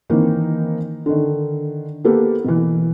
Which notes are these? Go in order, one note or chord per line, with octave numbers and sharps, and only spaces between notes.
D#3 E3 A#3 C4 D#4
D3 D#3
A#3 B3 G4 A4 B4
B2 E3